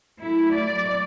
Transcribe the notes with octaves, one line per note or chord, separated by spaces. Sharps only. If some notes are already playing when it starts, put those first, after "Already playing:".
A2 F#3 A3 E4
D5